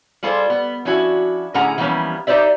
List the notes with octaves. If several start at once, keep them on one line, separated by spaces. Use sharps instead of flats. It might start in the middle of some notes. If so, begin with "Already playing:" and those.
G3 G#3 F4 A4 C5
B3
F3 C#4 D4 E4 F#4
A2 D3 C#4 G#4 F#5 A#5
E3 F3 G3 A#3 B3 C#4
D#4 G4 C5 D5 E5